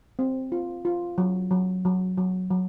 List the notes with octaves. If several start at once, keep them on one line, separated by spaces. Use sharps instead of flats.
C4
F4
F4
F#3
F#3
F#3
F#3
F#3